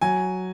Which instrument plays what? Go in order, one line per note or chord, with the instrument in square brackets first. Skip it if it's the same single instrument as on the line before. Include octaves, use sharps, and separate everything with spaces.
[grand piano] F#3 G#5